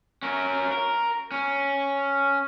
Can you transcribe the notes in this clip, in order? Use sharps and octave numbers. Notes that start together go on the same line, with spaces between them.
C#4 A#4
A#4
C#4